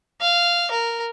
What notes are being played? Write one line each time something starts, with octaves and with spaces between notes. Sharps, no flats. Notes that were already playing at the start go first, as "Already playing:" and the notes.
F5
A#4